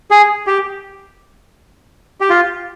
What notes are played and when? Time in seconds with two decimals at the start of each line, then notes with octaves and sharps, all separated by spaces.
0.11 G#4
0.47 G4
2.21 G4
2.30 F4